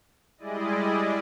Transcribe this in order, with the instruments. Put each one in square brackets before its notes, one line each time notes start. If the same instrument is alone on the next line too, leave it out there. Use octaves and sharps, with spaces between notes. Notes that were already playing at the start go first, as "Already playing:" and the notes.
[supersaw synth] G3 G#3 E4 G#4 D5 D#5